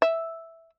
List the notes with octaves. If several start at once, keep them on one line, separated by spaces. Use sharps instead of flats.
E5